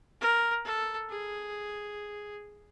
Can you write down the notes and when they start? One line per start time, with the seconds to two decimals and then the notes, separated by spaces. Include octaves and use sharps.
0.21 A#4
0.65 A4
1.09 G#4